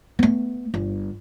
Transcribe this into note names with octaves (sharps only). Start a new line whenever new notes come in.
A3 B3
G1